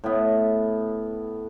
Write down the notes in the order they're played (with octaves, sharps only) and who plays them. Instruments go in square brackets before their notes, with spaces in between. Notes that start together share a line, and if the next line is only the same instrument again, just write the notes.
[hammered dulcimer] A2 B3